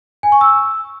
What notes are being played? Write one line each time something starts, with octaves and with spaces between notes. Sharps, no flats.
G#5
C#6
E6